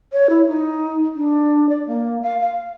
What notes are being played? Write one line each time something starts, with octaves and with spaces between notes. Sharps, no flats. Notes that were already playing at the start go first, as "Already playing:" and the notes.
C#5
E4
D#4
D4
D5
A#3
F5
F5